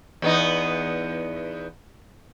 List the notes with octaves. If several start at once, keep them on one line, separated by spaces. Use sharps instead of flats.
E2 B3 D#4